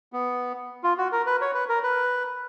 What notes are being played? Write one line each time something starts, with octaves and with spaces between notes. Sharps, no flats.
B3
F4
F#4
A#4
B4
C#5
B4
A#4
B4